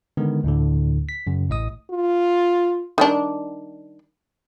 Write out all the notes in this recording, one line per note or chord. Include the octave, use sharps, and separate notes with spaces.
D3 D#3 G#3 B3
D2 A2 D3
B6
F#2 C#3
A1 A2 D#5 D#6
F4
D#3 G3 D4